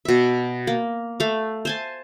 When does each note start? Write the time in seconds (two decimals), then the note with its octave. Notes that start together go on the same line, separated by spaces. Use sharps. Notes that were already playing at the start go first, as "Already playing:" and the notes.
0.05 B2 E5
0.67 A#3
1.20 A3 F5
1.65 C5 G#5 A5